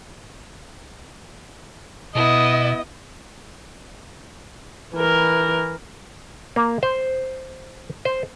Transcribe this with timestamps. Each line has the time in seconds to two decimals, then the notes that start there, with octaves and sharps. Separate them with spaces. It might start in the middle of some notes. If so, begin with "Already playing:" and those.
2.15 B2 B3 E4 D#5
4.94 E3 A#4
6.56 A#3
6.83 C5
8.05 C5